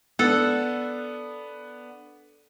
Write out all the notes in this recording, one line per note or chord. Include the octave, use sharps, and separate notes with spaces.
B3 D4 A4 F#5